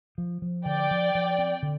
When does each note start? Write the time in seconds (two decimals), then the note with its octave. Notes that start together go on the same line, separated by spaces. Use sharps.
0.18 F3
0.42 F3
0.66 D3 D5 G5
0.91 F3
1.15 F3
1.38 C4
1.63 D3